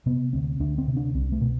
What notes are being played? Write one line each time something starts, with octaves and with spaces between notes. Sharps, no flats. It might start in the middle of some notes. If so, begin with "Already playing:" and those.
C3 B3
D2 C4
D2 D4
C4
C3
D4
C2 C4
A3
B2